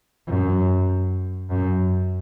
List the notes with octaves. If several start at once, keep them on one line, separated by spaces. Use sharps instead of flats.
F#2
F#2